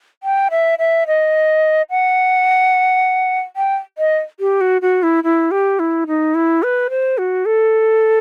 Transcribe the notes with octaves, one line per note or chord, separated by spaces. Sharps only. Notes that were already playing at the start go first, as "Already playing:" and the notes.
G5
E5
E5
D#5
F#5
G5
D#5
G4
F#4
F#4
E4
E4
G4
E4
D#4
E4
B4
C5
F#4
A4